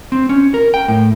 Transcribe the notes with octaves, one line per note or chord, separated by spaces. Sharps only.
C4
C#4
A#4
G5
A2